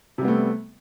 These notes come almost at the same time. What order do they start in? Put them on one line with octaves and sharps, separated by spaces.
C3 G3 B3 A3